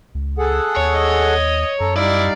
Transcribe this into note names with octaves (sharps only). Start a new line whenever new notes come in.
C#2
G#4 A4 F#5
D#2 C#5
D#5
F#2 A4 A#5
G3 D#4 E4 D5 F5